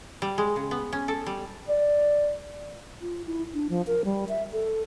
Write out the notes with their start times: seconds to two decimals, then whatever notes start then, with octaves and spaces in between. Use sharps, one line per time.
0.22 G3
0.38 G#3
0.56 C#3
0.71 B3
0.93 C#4
1.08 A4
1.26 G3
1.68 D5
3.01 F4
3.26 E4
3.54 D4
3.69 F3
3.87 A#4
4.05 G3
4.29 E5
4.53 A4